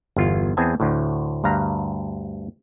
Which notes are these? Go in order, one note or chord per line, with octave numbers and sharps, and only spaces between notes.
G1 E2 F4
E2 C4 G#4 B4 G#5 A5
D2 A2
D2 G2 F5 A#5